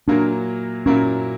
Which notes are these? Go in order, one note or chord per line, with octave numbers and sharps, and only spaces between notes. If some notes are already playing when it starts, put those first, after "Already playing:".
A#2 F#3 A#3 D4 E4 A#4
A#2 F#3 A#3 C#4 E4 A#4